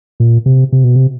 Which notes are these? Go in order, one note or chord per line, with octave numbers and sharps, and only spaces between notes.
A#2
C3
C3
B2
C3